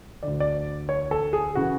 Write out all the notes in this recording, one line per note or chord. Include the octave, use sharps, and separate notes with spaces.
D2 D3 D5
D5
C#5
A4
G#4
C#3 E3 F#4